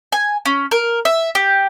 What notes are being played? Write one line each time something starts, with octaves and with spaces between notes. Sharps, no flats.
G#5
C#4
A#4
E5
G4